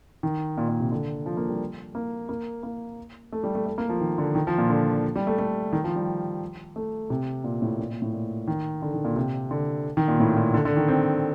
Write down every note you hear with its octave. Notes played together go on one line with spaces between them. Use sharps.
D#3
A#2
A#2
C3
D3
F3
A#3
G3
A#3
A#3
A#3
A3
G3
A3
A3
A#3
F3
D#3
D3
D#3
F3
A#2
D3
G3
A3
A3
D#3
F3
G3
A3
C3
A#2
A2
A#2
A#2
A2
A#2
D#3
D3
D#3
A#2
C3
D3
D#3
A#2
A2
A#2
D3
D3
D#3
C4